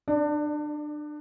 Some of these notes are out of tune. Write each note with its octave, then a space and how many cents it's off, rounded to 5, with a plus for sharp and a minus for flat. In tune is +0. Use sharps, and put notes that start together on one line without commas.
D4 +30 D5 +0